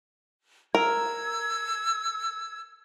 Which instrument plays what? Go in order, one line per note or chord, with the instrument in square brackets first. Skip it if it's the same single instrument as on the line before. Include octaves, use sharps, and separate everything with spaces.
[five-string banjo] A#4 [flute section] E6 G#6